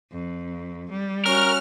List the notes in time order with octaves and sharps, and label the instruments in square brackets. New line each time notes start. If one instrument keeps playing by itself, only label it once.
[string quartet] F2
G3
[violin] C#4 F#4 [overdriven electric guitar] A#4 [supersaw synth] F6